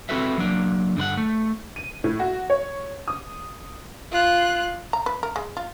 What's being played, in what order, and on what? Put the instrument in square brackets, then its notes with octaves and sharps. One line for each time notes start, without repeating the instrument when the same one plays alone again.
[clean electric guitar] C4 E4 F#4 A4 B4 E5
F#3 A#3 D4
G2 D3 B4 F#5
A3
[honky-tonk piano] D#7
A2
F#4
C#5
D#6
[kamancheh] F4 F#6
[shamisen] A#5
B4
A#4
G#3
F4